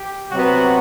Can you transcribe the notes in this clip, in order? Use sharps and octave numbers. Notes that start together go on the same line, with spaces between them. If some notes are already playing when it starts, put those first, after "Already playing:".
Already playing: G4
C3 F#3 B3 F#4